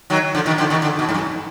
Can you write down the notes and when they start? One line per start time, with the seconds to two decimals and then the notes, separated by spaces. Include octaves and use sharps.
0.10 D#3 F#3
0.35 D3 F3
0.46 B2 D#3
0.58 D3 F3
0.70 B2 D#3
0.82 D3
0.99 B2
1.09 G#2
1.14 F#2